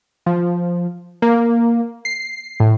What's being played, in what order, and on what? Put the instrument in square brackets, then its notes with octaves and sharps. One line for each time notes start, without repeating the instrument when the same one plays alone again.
[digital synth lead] F3
A#3
C7
A2